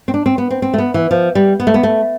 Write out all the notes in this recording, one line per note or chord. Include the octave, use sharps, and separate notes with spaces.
C4
D4
C4
B3
C4
C4
A3
B3
E3
F3
G3
B3
A3
B3
A3